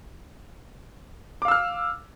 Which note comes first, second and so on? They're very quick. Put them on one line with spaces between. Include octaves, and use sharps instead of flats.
D6 F5 E6 F6